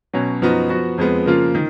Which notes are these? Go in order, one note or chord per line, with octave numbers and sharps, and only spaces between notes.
B2 F#3 C#4
F#2 F3 B3 D#4 F#4
F3 B3 F#4
F2 F3 G#3 B3
C#3 F3 A#3 F4
D#3